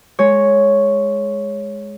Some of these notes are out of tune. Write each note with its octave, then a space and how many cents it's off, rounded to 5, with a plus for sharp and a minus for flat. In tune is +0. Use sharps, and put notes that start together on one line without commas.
G#3 +0 C#5 +0